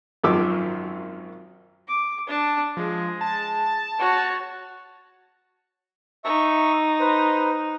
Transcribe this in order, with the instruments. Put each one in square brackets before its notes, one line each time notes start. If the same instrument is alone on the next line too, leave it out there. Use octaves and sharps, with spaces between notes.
[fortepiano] G#1 F#2 D#3 F3 D6 E6
[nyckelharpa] D6
D4 A5
[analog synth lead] F3 [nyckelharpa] G#3
[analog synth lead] A5
[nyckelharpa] F#4 C#5
[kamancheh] D#4 [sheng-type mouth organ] E5 C#6
[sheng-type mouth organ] B4 C5